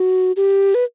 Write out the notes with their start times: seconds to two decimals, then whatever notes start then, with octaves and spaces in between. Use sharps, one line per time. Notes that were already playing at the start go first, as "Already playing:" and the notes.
Already playing: F#4
0.36 G4
0.74 B4